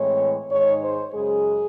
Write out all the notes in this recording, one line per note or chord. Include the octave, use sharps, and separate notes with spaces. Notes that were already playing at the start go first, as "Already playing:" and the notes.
Already playing: A2 E3 G#3 C4 C#5
G#2 D#3 G#3 D#4 C#5
C5
F#2 C#3 G#3 G#4